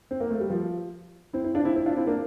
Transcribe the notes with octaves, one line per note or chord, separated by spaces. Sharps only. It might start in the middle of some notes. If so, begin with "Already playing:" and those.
C4
A#3
A3
G3
F3
C4 E4
C4 E4
D4 F4
C4 E4
C4 E4
D4 F4
C4 E4
A#3 D4